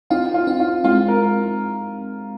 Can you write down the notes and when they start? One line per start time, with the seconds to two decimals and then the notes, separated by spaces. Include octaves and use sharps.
0.10 C4 D#4 F4
0.34 F4
0.47 C4 D#4
0.60 F4
0.84 G#3 C4 F4
1.08 A#4